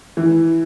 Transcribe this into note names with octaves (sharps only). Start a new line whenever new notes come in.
E3